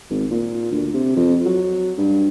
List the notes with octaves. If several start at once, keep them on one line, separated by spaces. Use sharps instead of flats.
G#1
A#2
D2
C3
F2
F#3
G2